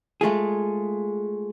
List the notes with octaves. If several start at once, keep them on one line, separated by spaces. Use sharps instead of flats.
G#3 A3 F4 G#4